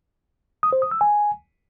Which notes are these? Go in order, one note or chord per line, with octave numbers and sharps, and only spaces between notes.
D#6
C5
D#6
E6
G#5